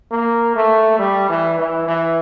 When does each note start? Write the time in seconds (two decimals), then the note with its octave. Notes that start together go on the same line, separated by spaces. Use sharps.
0.11 A#3
0.56 A3
0.99 G3
1.29 E3
1.58 E3
1.87 E3